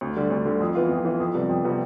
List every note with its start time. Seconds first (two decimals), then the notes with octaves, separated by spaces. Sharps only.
0.01 D2
0.16 D3 G3
0.30 D2
0.45 D3 G3
0.60 F2
0.75 E3 B3 F4
0.90 F2
1.05 E3 B3 F4
1.20 F2
1.34 C3 G3 B3
1.49 F2
1.64 C3 G3 B3